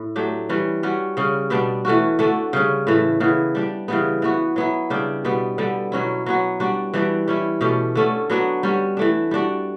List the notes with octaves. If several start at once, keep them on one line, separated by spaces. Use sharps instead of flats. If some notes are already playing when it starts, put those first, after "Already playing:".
Already playing: A2
F#3 A3 D4 G4
E3 G3 C#4
G3 C#4 F#4
C#3 G3 C#4
B2 G3 B3 D4
E3 A3 C#4 F#4
D3 A3 D4 F#4
C#3 G3 C#4
A2 E3 A3
C#3 E3 B3
G3 D4 G4
C#3 E3 G3 B3
E3 B3 F#4
F#3 B3 E4
C#3 G3 D4 G4
B2 G3 B3
D3 G3 B3
B2 F#3 C#4 E4
F#3 B3 F#4
G3 D4 F#4
E3 G3 D4 F#4
G3 C#4 E4
B2 A3 C#4 G4
D3 A3 C#4
F#3 B3 D4 F#4
G3 C#4 F#4
E3 A3 D4
G3 D4 F#4